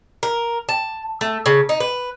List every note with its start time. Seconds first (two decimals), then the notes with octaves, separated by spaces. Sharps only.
0.23 A#4
0.69 A5
1.21 A3
1.46 C#3
1.69 D#4
1.80 B4